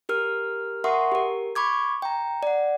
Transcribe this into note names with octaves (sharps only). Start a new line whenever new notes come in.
G4 A#4 F6
A#4 E5 F#5 C6 C#6 D#6
G4 A#4
B5 C#6 D6 G#6
G5 A#5
D5 F#5